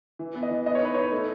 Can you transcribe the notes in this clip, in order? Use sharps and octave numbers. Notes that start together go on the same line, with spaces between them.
E3
B3
D#5
E3
B3 D#5
C#5
D#4 B4
D#4 C#5
A3